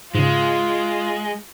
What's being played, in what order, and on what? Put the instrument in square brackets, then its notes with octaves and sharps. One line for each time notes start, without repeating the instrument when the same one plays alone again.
[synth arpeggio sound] G#2 C#3 [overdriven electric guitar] G#3 [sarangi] F4